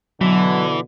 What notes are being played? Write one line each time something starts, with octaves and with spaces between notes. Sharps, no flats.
B2 D3 E3 F#3